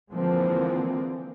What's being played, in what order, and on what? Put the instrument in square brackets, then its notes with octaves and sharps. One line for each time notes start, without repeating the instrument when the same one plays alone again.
[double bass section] D3 E3 F3 G#3 A#3 C4